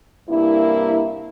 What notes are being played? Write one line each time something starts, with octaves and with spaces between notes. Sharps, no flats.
G2 C3 A#3 E4